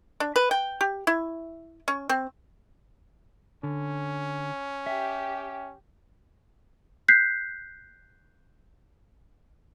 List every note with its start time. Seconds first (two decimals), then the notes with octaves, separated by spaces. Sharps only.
0.20 D4
0.36 B4
0.51 G5
0.81 G4
1.07 E4
1.88 C#4
2.09 C4
3.63 D3 C#4
4.86 G4 E5
7.08 F#6 G6 B6 C7